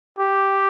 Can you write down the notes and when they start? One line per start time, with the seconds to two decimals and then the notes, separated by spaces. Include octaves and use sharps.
0.19 G4